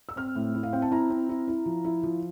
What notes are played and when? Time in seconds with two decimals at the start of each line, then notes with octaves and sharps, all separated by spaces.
0.09 E6
0.16 C4 F6
0.35 A2
0.54 E4
0.63 F5
0.72 C4 G5
0.82 A5
0.91 E4 A#5
1.10 C4
1.29 E4
1.48 E4
1.66 F3
1.85 E4
2.03 F3